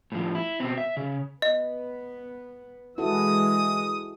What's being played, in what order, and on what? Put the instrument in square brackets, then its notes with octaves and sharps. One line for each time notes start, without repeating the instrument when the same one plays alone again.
[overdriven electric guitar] A2 F3
E4
B2 C4
E5
C#3
[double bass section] B3 [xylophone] D#5
[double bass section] E3 G#3 [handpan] E4 F#4 A4 [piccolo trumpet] D#6